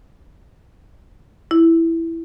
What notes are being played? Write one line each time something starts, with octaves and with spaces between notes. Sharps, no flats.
E4